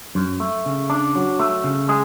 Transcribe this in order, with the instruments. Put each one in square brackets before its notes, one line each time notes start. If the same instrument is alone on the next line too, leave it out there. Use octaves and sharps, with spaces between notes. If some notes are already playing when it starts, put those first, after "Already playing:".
[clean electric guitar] F#2
A3
C#3
D4
F#3
A3
C#3
G#3 G#4